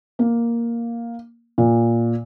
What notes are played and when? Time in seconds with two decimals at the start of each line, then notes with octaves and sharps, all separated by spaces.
0.19 A#3
1.58 A#2